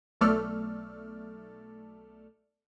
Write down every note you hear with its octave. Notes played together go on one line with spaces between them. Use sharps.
B1 A3 A4 D5 F6